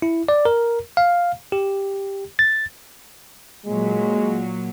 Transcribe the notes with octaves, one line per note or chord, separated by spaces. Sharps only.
E4
D5
A#4
F5
G4
A6
A#2 F#3 G#3